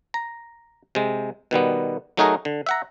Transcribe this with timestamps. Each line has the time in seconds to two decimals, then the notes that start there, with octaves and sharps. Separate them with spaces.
0.14 A#5
0.95 C3 G#3
1.51 B2 D#3 G3 B3
2.17 F#3 A3 D#4 F#4 G#4 A#4
2.45 D3
2.66 E5 F#5 A#5